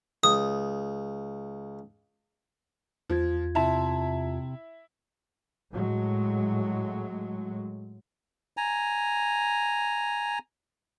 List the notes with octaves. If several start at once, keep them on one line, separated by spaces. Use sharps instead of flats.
C#2 D#6
E2 F3 F4 G#6
C3 E4 A5
A2 F#3 G#3
G#5 A#5